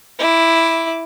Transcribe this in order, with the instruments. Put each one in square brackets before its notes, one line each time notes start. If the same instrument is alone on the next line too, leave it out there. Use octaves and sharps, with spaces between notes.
[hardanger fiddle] E4 D6